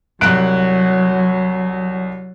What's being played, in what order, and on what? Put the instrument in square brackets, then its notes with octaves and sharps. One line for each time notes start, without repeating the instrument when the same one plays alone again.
[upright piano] C2 F#6 D7 [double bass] F#3